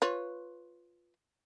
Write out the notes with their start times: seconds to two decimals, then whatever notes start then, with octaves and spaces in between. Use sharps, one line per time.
0.02 F4 B4 C#5